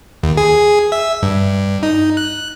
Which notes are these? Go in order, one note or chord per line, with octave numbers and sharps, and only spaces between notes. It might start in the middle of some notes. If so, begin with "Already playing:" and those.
D#2
G#4
E5
G2
D#4
F#6